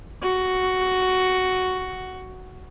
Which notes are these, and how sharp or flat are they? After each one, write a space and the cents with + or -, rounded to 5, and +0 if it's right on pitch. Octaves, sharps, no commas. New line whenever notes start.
F#4 +5